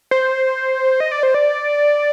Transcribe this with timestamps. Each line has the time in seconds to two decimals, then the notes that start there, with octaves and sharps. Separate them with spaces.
0.11 C5
1.00 D#5
1.12 D5
1.23 C5
1.34 D5